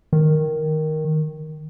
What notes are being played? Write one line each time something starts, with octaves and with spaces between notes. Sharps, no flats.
D#3